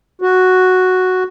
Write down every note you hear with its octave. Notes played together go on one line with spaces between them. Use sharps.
F#4